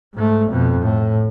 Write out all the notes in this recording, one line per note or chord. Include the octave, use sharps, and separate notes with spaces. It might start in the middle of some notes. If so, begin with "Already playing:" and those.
G#2 A3
F2 B2
A2